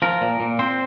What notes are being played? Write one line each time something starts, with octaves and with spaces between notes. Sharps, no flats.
F3 A#4
A#2
A#2
C4 C5